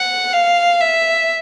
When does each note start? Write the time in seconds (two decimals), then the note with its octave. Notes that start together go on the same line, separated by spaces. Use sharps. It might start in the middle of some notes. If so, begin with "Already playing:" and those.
Already playing: F#5
0.33 F5
0.81 E5